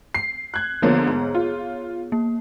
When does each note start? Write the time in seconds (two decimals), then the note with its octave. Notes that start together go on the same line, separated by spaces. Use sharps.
0.15 C7
0.54 F#6 G#6
0.82 D3 F3 A#3 B3 G#4 C#5
1.07 G#2
1.35 F4
2.12 A#3